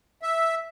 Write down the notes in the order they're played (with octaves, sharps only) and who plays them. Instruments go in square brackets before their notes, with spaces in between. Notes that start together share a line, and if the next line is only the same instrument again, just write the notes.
[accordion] E5